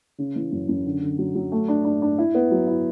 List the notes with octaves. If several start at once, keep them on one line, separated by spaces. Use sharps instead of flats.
C#3
E3
F#2
F#2
D3
D3
F#3
F#3
A3
D4
D4
D4
E4
B3
F#3
E4